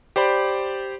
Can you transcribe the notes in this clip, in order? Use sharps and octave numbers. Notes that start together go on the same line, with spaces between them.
G4 C5 D5 B5